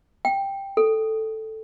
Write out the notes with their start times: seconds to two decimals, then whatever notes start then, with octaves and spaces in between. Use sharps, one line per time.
0.25 G5
0.77 A4